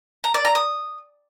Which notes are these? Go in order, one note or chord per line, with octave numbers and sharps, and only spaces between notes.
A#5
D5
A#5
D#6